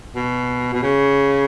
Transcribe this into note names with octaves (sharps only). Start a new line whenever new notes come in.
B2
B2
C#3